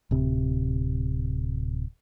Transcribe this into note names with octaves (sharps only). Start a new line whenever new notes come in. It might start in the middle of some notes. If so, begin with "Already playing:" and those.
D1 C3